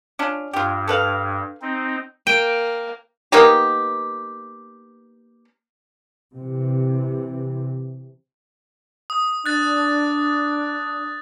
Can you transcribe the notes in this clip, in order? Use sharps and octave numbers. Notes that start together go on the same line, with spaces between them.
C#4 D4 F4
G2 F4 G4
A4 B4 F5
C4 D#4
A#3 G5 D7
A#3 B3 D#4 G4
C3 E3
D#6
D4 F#6 A6